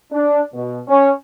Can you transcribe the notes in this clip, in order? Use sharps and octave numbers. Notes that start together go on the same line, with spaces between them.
D4
B2
C#4